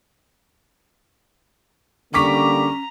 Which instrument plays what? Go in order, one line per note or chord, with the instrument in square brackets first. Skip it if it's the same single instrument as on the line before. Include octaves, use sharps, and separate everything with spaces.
[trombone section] D3 G3 A#3 [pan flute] C#4 [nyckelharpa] A#5 [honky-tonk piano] C#6 D6 B6